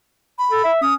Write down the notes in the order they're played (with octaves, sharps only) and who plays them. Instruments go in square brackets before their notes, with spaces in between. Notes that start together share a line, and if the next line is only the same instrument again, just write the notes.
[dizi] B5
[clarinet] A4
E5
[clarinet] C#4 [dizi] D#6